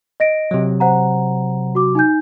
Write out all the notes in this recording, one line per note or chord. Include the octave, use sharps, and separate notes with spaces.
D#5 A#6 D7
C3 F#3
C5 F#5 A#5
F#4 D6
D#4 G#5 G6